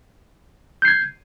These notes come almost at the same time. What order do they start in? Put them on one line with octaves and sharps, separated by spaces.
G6 C7 G#6